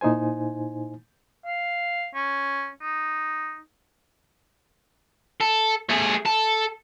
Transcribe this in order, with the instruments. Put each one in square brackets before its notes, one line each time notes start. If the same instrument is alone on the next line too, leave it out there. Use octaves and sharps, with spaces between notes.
[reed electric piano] A#2 D#4 E4 C5 G#5
[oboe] F5
C#4
D#4
[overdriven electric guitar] A4
A3 G#4
A4